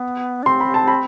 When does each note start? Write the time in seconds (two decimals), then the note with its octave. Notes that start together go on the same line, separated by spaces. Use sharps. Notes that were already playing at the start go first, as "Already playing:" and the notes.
Already playing: B3
0.43 D4
0.46 C4 C6
0.61 B5
0.74 A5
0.88 B5